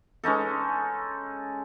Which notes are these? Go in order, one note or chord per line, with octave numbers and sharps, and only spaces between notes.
G#3 C#4 D#4 A4